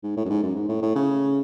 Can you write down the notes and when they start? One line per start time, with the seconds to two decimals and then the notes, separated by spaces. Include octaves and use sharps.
0.04 G#2
0.17 A2
0.25 F#2
0.29 G#2
0.43 F#2
0.56 G#2
0.69 A2
0.82 A2
0.95 C#3